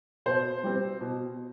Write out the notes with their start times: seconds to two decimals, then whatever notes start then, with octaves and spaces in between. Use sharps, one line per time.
0.26 B2 C5
0.64 G3 C4
1.01 B2